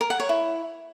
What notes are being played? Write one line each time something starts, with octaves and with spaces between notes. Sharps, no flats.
A#4
F#5
C#5
E4